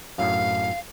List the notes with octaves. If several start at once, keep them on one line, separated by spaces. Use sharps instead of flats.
F#2 A2 F5